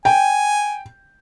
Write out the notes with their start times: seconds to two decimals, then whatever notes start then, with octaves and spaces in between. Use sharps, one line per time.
0.05 G5 G#5